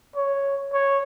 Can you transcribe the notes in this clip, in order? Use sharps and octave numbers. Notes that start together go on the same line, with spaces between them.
C#5
C#5